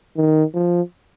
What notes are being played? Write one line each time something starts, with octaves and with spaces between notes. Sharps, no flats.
D#3
F3